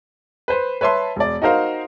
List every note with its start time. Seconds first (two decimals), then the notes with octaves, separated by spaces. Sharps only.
0.48 B4 C5
0.81 B4 C#5 E5 A5 C6
1.16 E1 D5
1.42 D#4 F#4 A#4 C5 F5